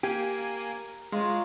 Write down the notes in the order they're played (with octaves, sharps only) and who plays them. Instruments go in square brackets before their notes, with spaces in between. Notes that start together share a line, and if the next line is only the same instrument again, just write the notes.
[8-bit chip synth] A#3 G#5 [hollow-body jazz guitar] G4
[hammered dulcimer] A#4
[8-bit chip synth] G#3 [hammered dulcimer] F4 A#4 C#5